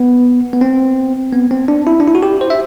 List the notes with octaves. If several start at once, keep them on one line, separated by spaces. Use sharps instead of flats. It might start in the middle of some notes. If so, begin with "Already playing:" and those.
Already playing: B3
B3
C4
B3
C4
D4
E4
D4
E4
F#4
G4
C5
E5